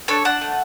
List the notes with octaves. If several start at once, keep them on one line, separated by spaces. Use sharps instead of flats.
D4 A4 C#5
D4 F#5 A5
A3